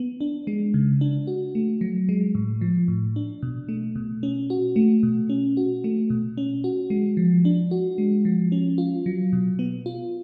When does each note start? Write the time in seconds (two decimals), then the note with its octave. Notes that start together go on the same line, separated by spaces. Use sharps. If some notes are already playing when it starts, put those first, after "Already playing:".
Already playing: B3
0.21 D4
0.47 G#3
0.74 C#3
1.01 D4
1.27 F#4
1.55 A3
1.81 F#3
2.09 G#3
2.35 A2
2.61 F3
2.88 A2
3.16 D4
3.43 B2
3.69 A3
3.96 B2
4.23 C#4
4.50 F#4
4.76 A3
5.03 B2
5.30 C#4
5.57 F#4
5.84 A3
6.10 B2
6.37 C#4
6.64 F#4
6.90 G#3
7.17 F3
7.45 D4
7.71 F#4
7.98 G#3
8.25 F3
8.52 C#4
8.78 F4
9.06 F#3
9.33 B2
9.59 B3
9.86 F4